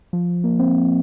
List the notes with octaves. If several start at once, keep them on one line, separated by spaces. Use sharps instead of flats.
F3
A#3
C4